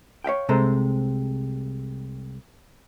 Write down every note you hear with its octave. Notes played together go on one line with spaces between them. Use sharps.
C#5 E5 F5 G5
C2 C3 G#3 A4 C5 A#5